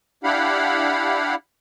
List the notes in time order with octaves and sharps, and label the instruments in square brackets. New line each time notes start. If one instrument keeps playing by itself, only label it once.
[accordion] D4 E4 G4 F5 F#5 B5